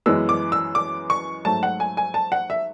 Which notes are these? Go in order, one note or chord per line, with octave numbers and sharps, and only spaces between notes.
F#2 E3 G#3 B3 E6
D6
E6
D6
C#6
G#2 F#3 A3 A5
F#5
G#5
G#5
A5
F#5
E5